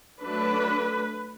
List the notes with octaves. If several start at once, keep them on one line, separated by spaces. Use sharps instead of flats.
F#3 A3 D4 B4